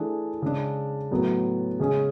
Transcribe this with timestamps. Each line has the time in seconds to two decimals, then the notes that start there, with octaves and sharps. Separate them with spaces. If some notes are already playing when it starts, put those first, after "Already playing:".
Already playing: E3 A3 D4 G#4
0.42 C#3 G#3 D4
1.11 A2 F#3 B3
1.79 C#3 G#3 C#4 G#4